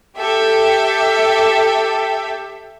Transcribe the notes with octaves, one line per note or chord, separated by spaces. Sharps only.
G4 A4 E5